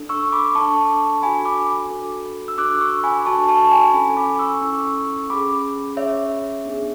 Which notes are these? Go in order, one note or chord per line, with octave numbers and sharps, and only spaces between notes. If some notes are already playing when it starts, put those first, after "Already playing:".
Already playing: D4 A4
C#6 E6
B5 D6
D4 A4 A5 C#6
D4 F#4 A4 G#5 B5
B5 D6
D4 F#4 A4
E6
D4 F#4 A4 D6 F#6
C#6 E6
G#5 B5
D4 F#4 A4 A5 C#6
A5 C#6
G#5 B5
C#4 E4 A4 G#5 B5
B5 D6
C#6 E6
C#4 E4 A4 C#6 E6
C#4 G#4 B5 D6
C#4 G#4 C#5 E5
B3 D4 G#4